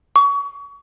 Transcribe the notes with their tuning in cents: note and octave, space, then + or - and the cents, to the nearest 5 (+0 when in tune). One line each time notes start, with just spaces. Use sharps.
C#6 +30